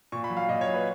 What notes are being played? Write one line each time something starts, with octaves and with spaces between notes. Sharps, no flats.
A#2 C#6
B5
F#3
F5
A#2 D#5
C#5
F#3
B4